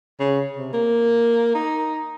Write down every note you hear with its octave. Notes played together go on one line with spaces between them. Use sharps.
C#3
C3
A#3
D#4